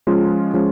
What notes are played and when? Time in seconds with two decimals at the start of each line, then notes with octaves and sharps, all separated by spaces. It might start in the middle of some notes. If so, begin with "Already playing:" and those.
0.07 F3 G#3 C#4 F4
0.54 F3 G#3 C#4 F4